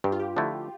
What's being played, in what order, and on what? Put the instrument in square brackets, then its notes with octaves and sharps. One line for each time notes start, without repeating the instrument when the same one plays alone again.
[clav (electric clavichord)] G2 [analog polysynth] G4
[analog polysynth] F4
G4
[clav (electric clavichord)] D3 F3 A3 E4